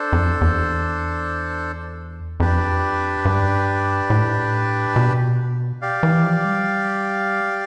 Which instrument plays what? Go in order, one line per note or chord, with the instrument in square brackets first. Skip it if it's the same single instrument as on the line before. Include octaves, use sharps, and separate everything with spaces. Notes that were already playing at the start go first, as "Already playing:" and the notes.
Already playing: [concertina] D4 A4 C5
[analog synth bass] F2
E2
[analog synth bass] F2 [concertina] D4 G4 B4 D5
[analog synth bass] G2
A2
B2
[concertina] G4 D5 F5
[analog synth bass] E3
F3
G3